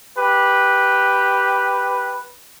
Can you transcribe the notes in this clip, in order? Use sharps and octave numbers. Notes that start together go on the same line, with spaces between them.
G4 B4